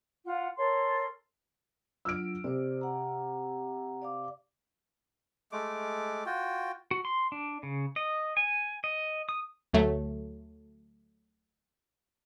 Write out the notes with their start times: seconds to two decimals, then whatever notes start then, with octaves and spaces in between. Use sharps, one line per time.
0.24 F4 F#5
0.56 A4 A#4 C#5 C6
2.05 F#3 D4 F4 E6 F6 D7
2.44 C3 C5 D5
2.81 F#5 A#5
4.02 D5 F5 D6
5.52 G#3 A3 D6
6.26 F4 F#4 G5
6.91 F#4
7.05 C6
7.32 D4
7.63 C#3
7.96 D#5
8.37 G#5
8.84 D#5
9.29 D#6
9.73 D2 F#3 A3